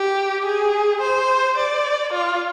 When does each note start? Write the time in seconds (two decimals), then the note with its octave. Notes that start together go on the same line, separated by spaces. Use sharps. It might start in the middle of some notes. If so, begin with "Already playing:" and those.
Already playing: G4
0.46 G#4
1.01 C5
1.57 D5
2.13 F4